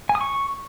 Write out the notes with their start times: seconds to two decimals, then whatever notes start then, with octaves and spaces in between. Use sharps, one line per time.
0.09 G#5
0.15 D#6
0.21 C#6